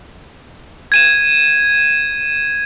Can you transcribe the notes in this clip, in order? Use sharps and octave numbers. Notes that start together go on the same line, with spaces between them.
G#6 D#7 E7